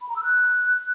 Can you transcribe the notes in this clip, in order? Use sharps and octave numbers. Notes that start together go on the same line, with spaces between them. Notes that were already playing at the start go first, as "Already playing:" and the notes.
B5
A#5
E6
F#6